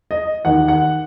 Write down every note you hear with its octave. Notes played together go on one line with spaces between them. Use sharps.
D#5
D#2 D#3 F#5
F#5